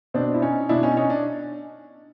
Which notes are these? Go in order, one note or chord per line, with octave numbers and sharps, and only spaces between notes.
B2 C4 D4
E4
C#4 D#4
B2 D4 E4
C#4 D#4
C#4 D#4
D4